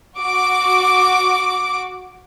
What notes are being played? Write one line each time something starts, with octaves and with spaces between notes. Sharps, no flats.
F#4 D6